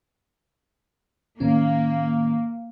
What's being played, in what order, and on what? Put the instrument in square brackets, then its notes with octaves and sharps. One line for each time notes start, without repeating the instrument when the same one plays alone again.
[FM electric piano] A2 D#3 C#4 [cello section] A#3